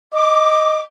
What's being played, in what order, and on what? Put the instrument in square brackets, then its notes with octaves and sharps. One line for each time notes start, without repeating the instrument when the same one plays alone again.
[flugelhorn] D#5 [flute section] D6